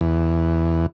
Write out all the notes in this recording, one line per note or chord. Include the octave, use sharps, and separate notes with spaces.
E2